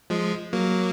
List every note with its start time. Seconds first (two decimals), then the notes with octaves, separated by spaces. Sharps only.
0.10 F3 G#3
0.53 F#3 A#3